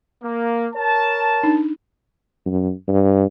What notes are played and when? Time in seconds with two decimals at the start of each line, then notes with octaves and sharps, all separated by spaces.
0.23 A#3
0.74 A#4 C#5 A5
1.43 D4 D#4
2.46 F#2
2.88 G2